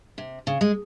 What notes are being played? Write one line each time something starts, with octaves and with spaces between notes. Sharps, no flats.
C3
C#3
G#3